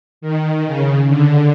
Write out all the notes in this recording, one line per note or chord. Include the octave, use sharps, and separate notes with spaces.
D#3
C#3
D3